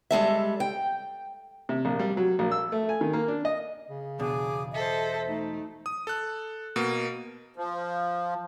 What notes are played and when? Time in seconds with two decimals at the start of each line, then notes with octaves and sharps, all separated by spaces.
0.11 G3 G#3 A4 E5
0.60 G5
1.69 C3
1.85 A#1
1.99 G3
2.17 F#3
2.39 A#1
2.51 E6
2.72 A3
2.89 G#5
3.01 D#3
3.13 A#3
3.28 D4
3.45 D#5
3.89 C#3
4.19 E2 B2 D4 G#4 D6 D#6
4.73 A4 C5 D#5 E5
5.28 A3 D#4
5.86 D#6
6.07 A4 F#6
6.76 B2 A#3
7.56 F3